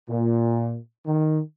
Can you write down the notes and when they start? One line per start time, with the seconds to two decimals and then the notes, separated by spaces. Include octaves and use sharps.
0.09 A#2
1.06 D#3